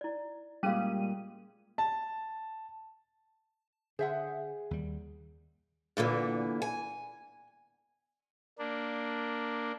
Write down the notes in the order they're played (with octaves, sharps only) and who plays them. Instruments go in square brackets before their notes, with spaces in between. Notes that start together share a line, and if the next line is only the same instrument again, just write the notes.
[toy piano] E4 D5
[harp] A#2 G#3 A#3 [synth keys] G3 D#7 [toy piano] C#4 G#4 F5
[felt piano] A5
[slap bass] D3 [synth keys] G#4 [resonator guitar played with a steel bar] C5 E5 F#5
[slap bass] D#2 G3
[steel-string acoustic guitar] E2 A#2 D3 E3
G#5
[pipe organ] A#3 D4